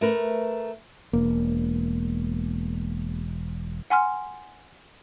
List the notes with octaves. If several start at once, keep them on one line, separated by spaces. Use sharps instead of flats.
A3 A#4 B4
E1 A#3
F#5 G#5 C6 F6